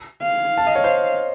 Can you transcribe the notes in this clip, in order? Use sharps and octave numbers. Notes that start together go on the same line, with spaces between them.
F5
A5
D#5
C#5
C5